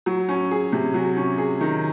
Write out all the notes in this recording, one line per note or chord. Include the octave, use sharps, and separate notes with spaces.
F#3
C#4
G#4
C3
F#3
C#4
G#4
D#3